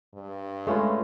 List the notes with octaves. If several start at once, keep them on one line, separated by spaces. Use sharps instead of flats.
G2
G#3 A3 C#4 F4 B4